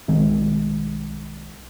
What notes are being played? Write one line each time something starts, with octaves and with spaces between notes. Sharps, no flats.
B1 D#3 G#3 C4